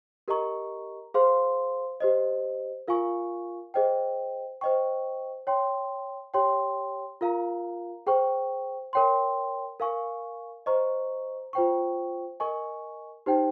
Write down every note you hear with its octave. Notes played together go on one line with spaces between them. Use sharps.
G4 A#4 D#5 A#5 C#6
G#4 C5 F5 C6
G4 C5 D#5
F4 A#4 F5 G#5 C#6
G#4 C5 D#5 G5
C5 D#5 G5 C#6
C#5 G5 C6
G4 C#5 G5 C6
F4 A#4 F5 A#5
G#4 C5 G5 C#6
A#4 C#5 G5 C6
A#4 F5 G#5 C#6
C5 D#5 A#5 C#6
F4 C5 G5 C#6
A#4 D#5 G#5 C#6
D#4 G4 C5 G5